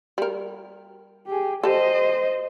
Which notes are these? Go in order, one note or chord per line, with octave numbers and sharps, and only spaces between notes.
G3 A#4
G4 G#4
G4 A4 C5 D#5